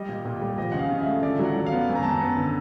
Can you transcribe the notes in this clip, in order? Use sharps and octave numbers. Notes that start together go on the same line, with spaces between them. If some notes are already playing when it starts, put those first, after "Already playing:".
Already playing: G3 D#5
A#2
A#2
G5
G3
F3 D#5
C#3 F#5
F5
C#3
E5
A3
D3 D5
F#3
F#5
F#3
F5
B3
F#2
A#5
F#2 A5
A#5
B3
D3